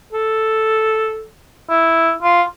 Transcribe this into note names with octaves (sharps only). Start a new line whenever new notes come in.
A4
E4
F4